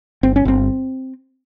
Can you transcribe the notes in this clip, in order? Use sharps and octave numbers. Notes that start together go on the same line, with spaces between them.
G1 C4
C#4
G1 C4